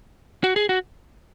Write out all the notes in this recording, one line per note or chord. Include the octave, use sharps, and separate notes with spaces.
F#4
G#4
F#4